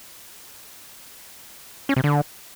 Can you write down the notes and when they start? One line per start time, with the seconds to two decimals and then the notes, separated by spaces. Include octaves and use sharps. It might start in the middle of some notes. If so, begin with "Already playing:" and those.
1.89 C#4
1.96 C3
2.04 D3